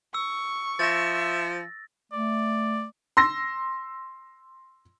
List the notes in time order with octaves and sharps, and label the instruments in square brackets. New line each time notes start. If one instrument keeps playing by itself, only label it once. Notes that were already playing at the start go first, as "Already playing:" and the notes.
[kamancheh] C#6 [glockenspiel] E6
[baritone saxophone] F3 [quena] E5 [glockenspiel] A6 A#6
[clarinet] A3 [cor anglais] D5
[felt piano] C6 E6 A#6